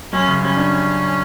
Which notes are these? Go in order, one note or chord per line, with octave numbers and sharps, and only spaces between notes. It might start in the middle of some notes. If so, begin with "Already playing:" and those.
F#2 C#4
C#3
G3 C#4
D4